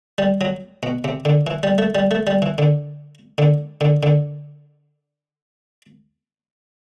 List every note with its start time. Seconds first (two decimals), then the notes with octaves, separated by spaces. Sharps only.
0.18 G3
0.41 F#3
0.83 B2
1.04 C3
1.25 D3
1.47 E3
1.63 G3
1.78 A3
1.95 G3
2.11 A3
2.27 G3
2.42 E3
2.58 D3
3.38 D3
3.81 D3
4.03 D3